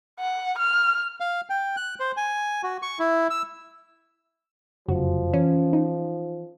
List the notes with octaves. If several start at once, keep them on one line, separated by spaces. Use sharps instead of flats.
F#5
F6
F5
G5
F#6
C5
G#5
F#4
C#6
E4
E6
F1 F#2 C#3 F3 F#4
E3 C#4
D#4